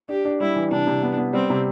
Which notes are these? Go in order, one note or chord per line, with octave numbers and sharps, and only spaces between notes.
D4 G4
D4
G3 E4
E3
C3 D4
C3
B3
B3
G3 C4
C3